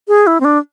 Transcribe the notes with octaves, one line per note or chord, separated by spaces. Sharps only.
G#4
E4
C4
D4